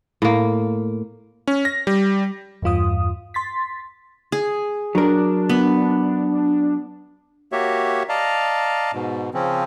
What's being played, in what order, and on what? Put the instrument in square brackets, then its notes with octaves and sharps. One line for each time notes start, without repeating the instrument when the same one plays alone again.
[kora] A2 A#3
[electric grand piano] C#4
A#6
G3
[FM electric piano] E2 G2 F4 D#6
C6 A6 B6
[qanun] G#4
[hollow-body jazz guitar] F#3 A#4 [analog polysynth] D4
[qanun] B3
[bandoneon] A#3 F#4 G4 C#5 E5
D5 D#5 F5 A5 A#5
G#2 B2
C#3 F3 C4 C#4